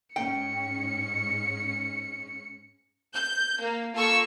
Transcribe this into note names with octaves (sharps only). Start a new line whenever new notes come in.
G#2 C#4 G5 C#7
G6
A#3
A#3 F4 A4 C#6 E6